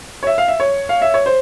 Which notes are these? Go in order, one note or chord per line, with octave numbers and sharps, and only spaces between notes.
C#5
E5
F5
E5
C#5
F5
E5
C#5
C5